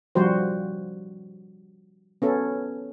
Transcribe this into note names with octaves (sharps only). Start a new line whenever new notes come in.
F3 G3 F#4 C5
B3 C#4 A4